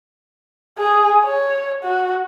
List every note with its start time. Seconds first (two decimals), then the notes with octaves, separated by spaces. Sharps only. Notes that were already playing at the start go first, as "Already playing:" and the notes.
0.78 G#4
1.24 C#5
1.83 F#4